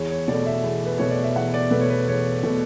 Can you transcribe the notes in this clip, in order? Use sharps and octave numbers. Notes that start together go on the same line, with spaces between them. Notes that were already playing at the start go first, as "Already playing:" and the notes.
Already playing: E2 C#5
C#5
B2 A3 D5
E5
E2
B4
B2 A3 C#5
D5
E5
E2 F#5
D5
B2 A3 B4
C#5
B4
E2 C#5
B2 A3